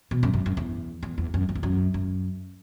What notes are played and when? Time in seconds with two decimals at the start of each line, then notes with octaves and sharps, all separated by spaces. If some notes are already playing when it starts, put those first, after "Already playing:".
0.11 B2
0.23 F#2
0.34 F#2
0.46 F#2
0.57 E2
1.03 E2
1.18 E2
1.34 F#2
1.49 F#2
1.55 E2
1.63 F#2
1.94 F#2